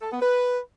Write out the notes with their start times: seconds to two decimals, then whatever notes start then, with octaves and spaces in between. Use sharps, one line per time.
0.01 A4
0.10 B3
0.20 B4